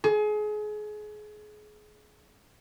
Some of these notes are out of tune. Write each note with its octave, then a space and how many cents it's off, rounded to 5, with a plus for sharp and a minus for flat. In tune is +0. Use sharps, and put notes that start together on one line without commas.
G#4 +30